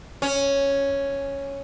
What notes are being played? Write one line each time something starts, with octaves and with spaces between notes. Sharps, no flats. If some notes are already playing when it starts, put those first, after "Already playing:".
C#4